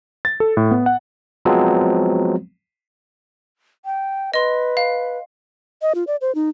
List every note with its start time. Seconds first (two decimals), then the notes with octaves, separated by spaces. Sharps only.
0.25 A6
0.40 A4
0.57 A2
0.71 B3
0.86 F#5
1.45 F3 F#3 G#3 B3 C4
3.85 G5
4.34 B4 D#5 C6
4.77 F5
5.82 D#5
5.95 F4
6.07 D5
6.21 C5
6.35 D#4